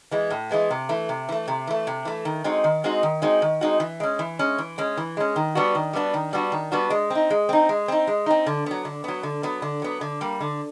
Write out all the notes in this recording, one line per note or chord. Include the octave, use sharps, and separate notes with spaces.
E3 G#3 B3
A2
E3 G#3 B3
C3
E3 A3
C3
E3 A3
C3
E3 A3
C3
E3 A3
D#3
G#3 C4 D#4 F#4
D#3
G#3 C4 D#4 F#4
D#3
G#3 C4 D#4 F#4
D#3
G#3 C4 D#4 F#4
E3
G#3 C#4
E3
G#3 C#4
E3
G#3 C#4
E3
G#3 C#4
D#3
G3 B3 D4 F#4
D#3
G3 B3 D4 F#4
D#3
G3 B3 D4 F#4
D#3
G3 B3 D4 F#4
G#3
C4 D#4
G#3
C4 D#4
G#3
C4 D#4
G#3
C4 D#4
D3
F#3 B3
D3
F#3 B3
D3
F#3 B3
D3
F#3 B3
D3
G3 A#3
D3